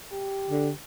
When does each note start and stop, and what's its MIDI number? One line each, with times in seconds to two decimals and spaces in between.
0.12 0.72 67
0.50 0.71 50